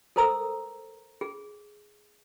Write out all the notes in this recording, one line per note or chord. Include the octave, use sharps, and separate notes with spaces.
A4 A#4 C5 A#5 D#6 E6
G#4